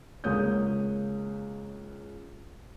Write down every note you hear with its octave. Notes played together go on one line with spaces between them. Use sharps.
C#2 G#3 A#3 C#5 D#6 G6